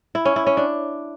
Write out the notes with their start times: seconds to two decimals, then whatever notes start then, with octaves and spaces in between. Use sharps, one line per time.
0.15 E4
0.25 C#4
0.36 E4
0.47 C#4
0.57 D4